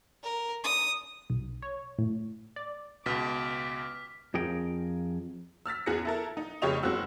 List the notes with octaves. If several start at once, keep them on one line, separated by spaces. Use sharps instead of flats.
A#4
D#6
B1
C#5
A2
D5
C#2 B2 D6 F6 B6
F2 F3 G#4 A#4 G5
E6 F6 A6 B6
E2 G#4 F#6 A#6 C#7
E4 A4 A#4
D#4
F1 C#3 G4 C#5 D#5 F7
F#1 G#3 C4 F#4 E6